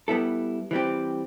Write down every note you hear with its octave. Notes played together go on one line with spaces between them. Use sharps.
G3 B3 E4 A4
E3 G3 C4 G4